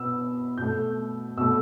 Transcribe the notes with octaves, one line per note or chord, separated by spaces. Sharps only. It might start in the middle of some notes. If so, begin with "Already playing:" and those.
Already playing: B2 B3 E6
B2 A3 G6
B2 A3 E6